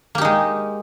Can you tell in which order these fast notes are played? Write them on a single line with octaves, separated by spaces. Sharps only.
A#3 G4 D#4 G#3